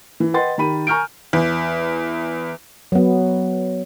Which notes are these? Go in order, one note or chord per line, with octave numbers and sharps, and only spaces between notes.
E3
B4 D#5 F#5 G5 C6 A6
D#3 G4 B5 D#7
G#5 A#5 C#6 F6 G6 D7
E2
F#3 B3